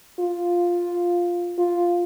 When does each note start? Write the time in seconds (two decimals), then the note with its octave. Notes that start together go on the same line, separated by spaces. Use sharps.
0.19 F4
1.58 F4